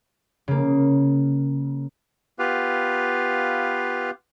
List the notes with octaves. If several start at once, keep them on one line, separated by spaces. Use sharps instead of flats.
C#3 A#3
B3 F4 G4 B4 F5